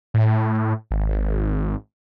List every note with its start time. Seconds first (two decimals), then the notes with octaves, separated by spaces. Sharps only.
0.14 A2
0.91 G#1